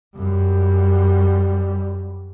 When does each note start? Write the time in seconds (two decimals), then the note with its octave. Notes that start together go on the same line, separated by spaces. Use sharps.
0.16 F#2 G3